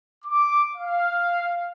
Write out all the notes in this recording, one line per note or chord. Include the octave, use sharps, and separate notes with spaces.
D6
F5